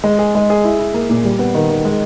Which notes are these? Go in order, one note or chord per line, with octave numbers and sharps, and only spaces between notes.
G#3
G#4
G#3
G#4
E4
E4
A#3
A#2
G3
B3
D#3
D#3
G#3